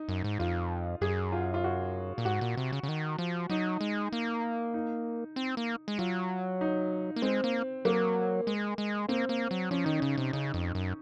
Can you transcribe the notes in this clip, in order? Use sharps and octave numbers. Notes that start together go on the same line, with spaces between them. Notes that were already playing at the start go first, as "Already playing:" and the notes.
Already playing: D#4
F#2
G#2
F2 F4
F#2 G#4
F4
F4
F#4
A#2
G#2 F#4
A#2
C3
C#3
C#3
D#3
F3
F#3 D#4
G#3
A#3
D#4
C4
A#3
G#3
F#3 F4
D#4
A#3
G#3 C4
A#3
F#3 A#3
G#3
G#3
A#3 C4
A#3
F#3
F3 C#4
D#3 D#4
C#3 C#4
C3
C#3 D#4
F2
F#2